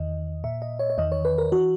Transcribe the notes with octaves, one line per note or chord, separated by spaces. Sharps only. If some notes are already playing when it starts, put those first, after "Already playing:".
Already playing: E2 D#3 D#5
A#2 E5
D#5
C#5
C#5
E2 D#3 D#5
C#5
B4
A#4
E3 F#4